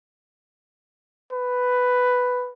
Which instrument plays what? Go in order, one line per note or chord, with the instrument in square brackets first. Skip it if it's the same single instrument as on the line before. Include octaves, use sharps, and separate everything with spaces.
[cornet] B4